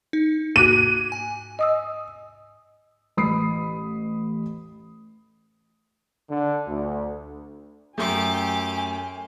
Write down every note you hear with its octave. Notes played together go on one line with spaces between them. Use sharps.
D#4
G#2 A#3 F#4 D6 F#6 D#7
G#5
D#5 D#6 E6
A1 B5 D#6 C7
D3
D2
F#2 A3 G4 G#5 D6